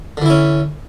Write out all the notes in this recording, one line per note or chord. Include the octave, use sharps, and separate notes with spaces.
D3 E3 C#4 E4